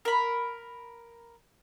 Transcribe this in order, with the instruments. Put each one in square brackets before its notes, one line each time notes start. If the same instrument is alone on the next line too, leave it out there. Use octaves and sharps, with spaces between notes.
[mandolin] A#4 B5